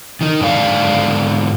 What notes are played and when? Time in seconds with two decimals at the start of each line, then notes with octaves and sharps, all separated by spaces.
0.21 D#3 D#4
0.40 G#2 D3 D5 F5